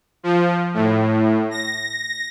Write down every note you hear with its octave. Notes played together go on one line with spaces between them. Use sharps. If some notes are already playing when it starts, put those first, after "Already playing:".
F3
A2
A#6